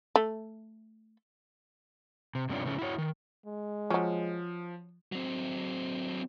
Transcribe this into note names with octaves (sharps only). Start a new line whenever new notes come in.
A3
C3
G2 C3 C#4 D4 F4
A2 C#3 F3 A3 C#4
E4 F#4 C#5
D#3
G#3
F3 F#3 C#4
F#3 C4